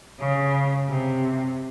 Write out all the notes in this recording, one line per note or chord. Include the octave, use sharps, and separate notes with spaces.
C#3
C3